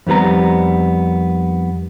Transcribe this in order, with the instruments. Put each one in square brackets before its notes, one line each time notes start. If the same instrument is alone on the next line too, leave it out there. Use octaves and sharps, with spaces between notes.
[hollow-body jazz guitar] F2 D#3 G3 B3 A#5